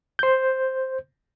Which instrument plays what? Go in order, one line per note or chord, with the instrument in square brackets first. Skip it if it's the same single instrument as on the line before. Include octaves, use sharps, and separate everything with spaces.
[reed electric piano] C5 G6